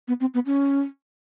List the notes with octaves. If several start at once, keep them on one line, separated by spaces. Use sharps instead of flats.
B3
C4
B3
C#4